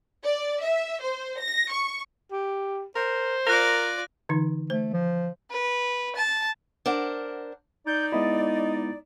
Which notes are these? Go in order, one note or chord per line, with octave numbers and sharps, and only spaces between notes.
D5
E5
C5
A#6
C#6
G4
A#4 C5
F4 A#4 D5 F#6 A#6
D3 E3 D#4
A3 C5
F3
B4
A5
D4 A#4 C5 F#5
D#4 D5 G6
G#3 B3 E4 D#5